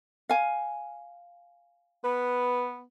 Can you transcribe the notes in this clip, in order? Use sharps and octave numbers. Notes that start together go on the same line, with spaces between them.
F5 G#5
B3 B4